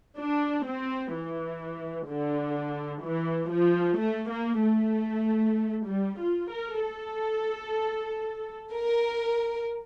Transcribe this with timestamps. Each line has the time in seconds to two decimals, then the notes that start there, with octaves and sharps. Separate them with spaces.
0.20 D4
0.68 C4
1.14 E3
2.10 D3
3.05 E3
3.52 F3
3.99 A3
4.32 A#3
4.63 A3
5.89 G3
6.22 F4
6.53 A#4
6.85 A4
8.74 A#4